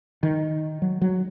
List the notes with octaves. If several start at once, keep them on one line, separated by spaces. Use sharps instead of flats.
D#3
F#3
F#3